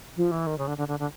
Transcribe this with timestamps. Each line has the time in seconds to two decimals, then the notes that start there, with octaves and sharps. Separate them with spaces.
0.17 F3
0.31 E3
0.47 D#3
0.58 C#3
0.67 D3
0.78 D3
0.88 D3
0.99 D3